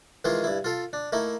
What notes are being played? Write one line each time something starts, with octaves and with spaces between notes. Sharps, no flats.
D#3 E3 G#3 F4 G#4
G2 E4
F4 A4 F5
D4
A3 A#3 D#4 E4